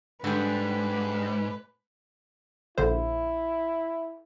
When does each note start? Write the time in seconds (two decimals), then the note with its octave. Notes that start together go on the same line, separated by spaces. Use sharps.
0.24 G#2 D3 G3 B4
2.78 A#1 D3 E4 C5